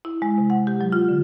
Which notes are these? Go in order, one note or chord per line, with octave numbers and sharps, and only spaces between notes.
E4
G#3
C3
F#5
G4
F#3
F4
D3